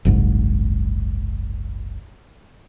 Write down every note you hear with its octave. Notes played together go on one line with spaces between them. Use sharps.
F#1 C2 G#2